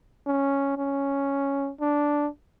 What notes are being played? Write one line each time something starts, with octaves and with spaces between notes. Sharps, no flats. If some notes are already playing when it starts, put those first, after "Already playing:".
C#4
C#4
D4